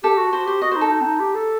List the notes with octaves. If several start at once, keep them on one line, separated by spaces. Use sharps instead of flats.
G4 A4
F#4
F#4 C5
G4 C5
F#4 D#5
C5
D#4
A4
D#4
C4
D#4
G4
A4